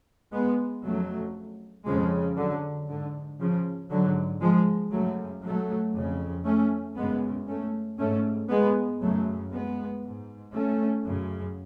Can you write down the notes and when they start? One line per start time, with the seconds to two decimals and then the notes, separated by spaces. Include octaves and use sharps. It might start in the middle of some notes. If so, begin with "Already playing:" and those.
0.33 G#3 B3
0.84 F2 C#3 F#3 A3
1.86 F2 C#3 F3 G#3
2.38 D3 F#3
2.88 G#2 D3
3.40 C#3 F3
3.91 G#2 D3 F#3
4.42 F3 G#3
4.92 F#2 C#3 F#3 A3
5.44 F#3 A3
5.96 F2 C#3
6.46 A3 C#4
6.97 F#2 C#3 G#3 B3
7.48 A3 C#4
7.99 G#2 A3 C#4
8.50 G#3 B3
9.02 F#2 C#3 F#3 A3
9.52 G#3 B3
10.03 G#2
10.54 A3 C#4
11.05 F#2 C#3